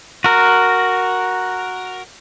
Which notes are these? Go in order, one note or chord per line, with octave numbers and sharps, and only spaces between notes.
F#4 A#4